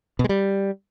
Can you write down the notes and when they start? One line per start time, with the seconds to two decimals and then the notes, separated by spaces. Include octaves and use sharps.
0.19 B2
0.24 G#3
0.29 G3